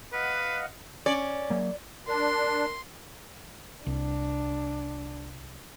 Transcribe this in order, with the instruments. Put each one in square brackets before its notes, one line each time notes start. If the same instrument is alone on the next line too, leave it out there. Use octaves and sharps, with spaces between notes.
[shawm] B4 [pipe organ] D#5 F5 F#5
[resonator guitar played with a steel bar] C#4 [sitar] D5
[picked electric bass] F#3 A#3
[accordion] D4 [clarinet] A#4 [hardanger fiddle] C6
[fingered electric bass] C2 [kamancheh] D4